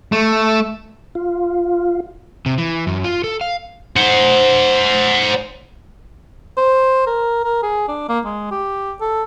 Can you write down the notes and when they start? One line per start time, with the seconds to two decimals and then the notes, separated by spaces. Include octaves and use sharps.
0.12 A3
1.15 F4
2.46 C3
2.58 E3
2.87 F#2
3.04 F4
3.24 A4
3.41 F5
3.96 C5 F#5
6.57 C5
7.07 A#4
7.44 A#4
7.63 G#4
7.88 D4
8.09 A#3
8.25 G#3
8.51 G4
9.01 A4